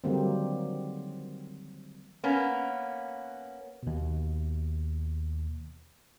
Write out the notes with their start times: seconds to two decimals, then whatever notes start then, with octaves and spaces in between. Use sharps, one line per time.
0.04 D3 D#3 F#3 G3 A#3 C4
2.24 A#3 B3 C#4
3.83 D#2 B2